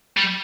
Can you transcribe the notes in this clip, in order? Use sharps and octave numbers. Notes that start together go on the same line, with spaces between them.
G3